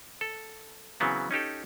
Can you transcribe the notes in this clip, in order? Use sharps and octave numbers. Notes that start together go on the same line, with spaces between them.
A4
C#3 E3 F#3 B3 C4
C#4 D#4 G4 A4